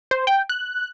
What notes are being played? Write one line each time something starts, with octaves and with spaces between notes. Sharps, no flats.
C5
G5
F#6